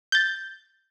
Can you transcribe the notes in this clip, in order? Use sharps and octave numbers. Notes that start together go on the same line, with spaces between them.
G6 A6